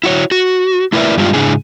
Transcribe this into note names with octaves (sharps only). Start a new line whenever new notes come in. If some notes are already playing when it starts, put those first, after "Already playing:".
E4 F#4 C#5
F#4
A3 E4 A#4 B4 D5 E5
G2 G3 G#3 D4 D#4 F4
G#2 C#3 D4 E4 G#4